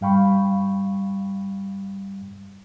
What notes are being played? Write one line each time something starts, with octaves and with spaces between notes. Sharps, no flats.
G2 G3 F5 G5 B5 C#6